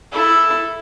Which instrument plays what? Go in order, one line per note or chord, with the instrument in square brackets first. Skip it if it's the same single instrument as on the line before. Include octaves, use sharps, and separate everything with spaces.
[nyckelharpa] E4 A4